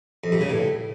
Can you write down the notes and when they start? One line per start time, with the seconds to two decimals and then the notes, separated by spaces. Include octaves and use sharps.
0.24 F2
0.32 G2
0.41 C#3
0.50 A2